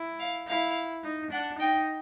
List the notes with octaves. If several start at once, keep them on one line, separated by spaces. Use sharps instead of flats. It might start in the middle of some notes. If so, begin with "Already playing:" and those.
Already playing: E4
F5
E4 F5
D#4
D4 F#5
D#4 G5